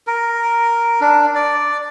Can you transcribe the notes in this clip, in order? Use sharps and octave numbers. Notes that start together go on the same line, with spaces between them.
A#4
D4
D5